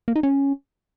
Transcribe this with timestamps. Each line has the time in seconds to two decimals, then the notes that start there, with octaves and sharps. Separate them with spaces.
0.08 A#3
0.16 D#4
0.23 C#4